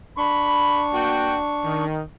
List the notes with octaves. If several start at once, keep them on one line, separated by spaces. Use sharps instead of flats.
D4 B5 C#6
A#3 F#4 G5
D#3